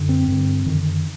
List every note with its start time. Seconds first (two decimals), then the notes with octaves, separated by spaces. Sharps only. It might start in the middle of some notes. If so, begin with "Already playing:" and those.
Already playing: F#2 D3
0.09 C4
0.28 G2 D3
0.66 F#2 D3 D#3